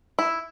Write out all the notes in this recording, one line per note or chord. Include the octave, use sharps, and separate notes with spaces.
E4